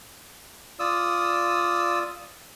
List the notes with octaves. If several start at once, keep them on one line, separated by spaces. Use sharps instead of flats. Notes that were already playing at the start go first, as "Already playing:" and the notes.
F4 D5 D#6 E6